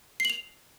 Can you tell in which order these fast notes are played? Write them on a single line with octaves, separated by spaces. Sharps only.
C7 F#7 F7